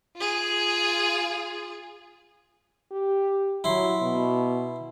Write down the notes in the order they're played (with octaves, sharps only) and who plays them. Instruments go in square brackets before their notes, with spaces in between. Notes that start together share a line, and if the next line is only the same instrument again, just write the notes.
[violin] F4 G#4
[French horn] G4
[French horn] F#3 [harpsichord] E4 C6
[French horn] B2